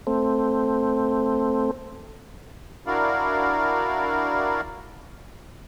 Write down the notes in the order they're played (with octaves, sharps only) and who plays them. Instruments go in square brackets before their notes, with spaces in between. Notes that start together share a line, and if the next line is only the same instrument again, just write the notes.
[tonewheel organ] A3 C4
[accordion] D4 E4 F#4 A#4 D5 F5